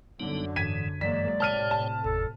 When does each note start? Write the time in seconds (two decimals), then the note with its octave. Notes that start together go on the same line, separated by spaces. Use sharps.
0.20 F#2 D3 G3 B3 D#4
0.56 G#2 E3 G#6 B6 D#7
1.01 G2 E3 F#3 G#3 A#3 D5 B6
1.40 A2 C3 C#5 G5 A5 F6 D#7
1.71 A5
2.04 G1 E2 A4